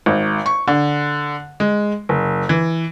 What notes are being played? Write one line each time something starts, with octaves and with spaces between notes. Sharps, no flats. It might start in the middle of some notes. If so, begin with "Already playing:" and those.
G#1
C#6
D3
G#3
F#1
E3